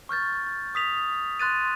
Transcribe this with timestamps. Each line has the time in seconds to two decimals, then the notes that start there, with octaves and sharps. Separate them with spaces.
0.09 C#6 F6 G6 A6
0.75 D#6 B6 F7
1.39 C6 F#6 A6 D#7